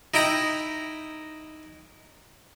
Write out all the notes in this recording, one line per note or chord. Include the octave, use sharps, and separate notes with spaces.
D#4 E4 G5 A#5